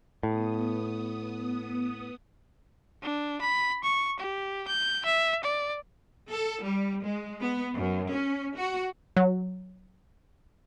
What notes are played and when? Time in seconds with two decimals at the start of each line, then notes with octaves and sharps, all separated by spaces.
0.23 A2 B3 D#6
3.03 D4
3.41 B5
3.84 C#6
4.19 G4
4.68 G6
5.05 E5
5.44 D5
6.28 A4
6.63 G3
7.01 G#3
7.41 B3
7.76 F#2
8.13 C#4
8.57 F#4
9.17 F#3